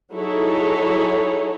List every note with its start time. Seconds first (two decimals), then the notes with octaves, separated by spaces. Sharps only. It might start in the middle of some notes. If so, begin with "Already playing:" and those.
0.13 F#3 D#4 E4 G#4 A4 C#5